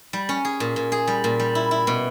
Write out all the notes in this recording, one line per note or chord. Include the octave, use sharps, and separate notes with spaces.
G3
C#4
G#4
A#2
A#2
G#4
G3
A#2
G3
E4
E4
B2